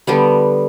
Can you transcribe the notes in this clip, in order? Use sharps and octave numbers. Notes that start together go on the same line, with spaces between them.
D3 G3 B3